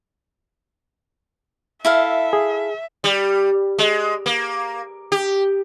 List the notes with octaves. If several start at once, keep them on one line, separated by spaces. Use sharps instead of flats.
E4 A4 E5 F5
G#4
G3
G#3
A#3
G4